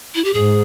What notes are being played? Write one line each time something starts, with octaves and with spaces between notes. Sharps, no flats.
E4
G4
G#2 G#4